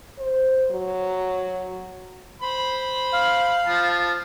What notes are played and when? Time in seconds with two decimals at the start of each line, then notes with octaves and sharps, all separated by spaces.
0.18 C5
0.71 F#3
2.42 C5 B5
3.13 F5
3.66 F3 A5